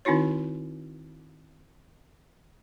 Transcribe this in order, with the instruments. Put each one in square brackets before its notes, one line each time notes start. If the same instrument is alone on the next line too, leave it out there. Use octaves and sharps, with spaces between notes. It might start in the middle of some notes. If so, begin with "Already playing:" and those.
[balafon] D#3 C4 D#4 E4 F#4 C#5